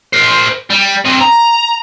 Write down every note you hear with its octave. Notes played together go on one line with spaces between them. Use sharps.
A#4 C5
G3
C4 D#5
A#5